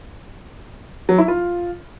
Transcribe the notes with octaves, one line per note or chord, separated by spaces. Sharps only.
F#3
E4
F4